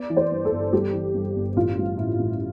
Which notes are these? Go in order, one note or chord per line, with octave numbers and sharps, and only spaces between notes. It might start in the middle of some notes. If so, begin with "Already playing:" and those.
Already playing: B3 D5
E3
C5
G2
A4
G1
G3 G4
E3
G2
G1
A1 F4
G3
A2 E4
A1